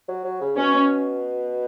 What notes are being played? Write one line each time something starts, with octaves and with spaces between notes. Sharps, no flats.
F#3
F#3
C#3
B2 C#4